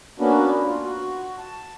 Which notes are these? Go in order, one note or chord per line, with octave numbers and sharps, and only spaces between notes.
A#3 B3 C#4 D4 F#4
F4
F#4
A5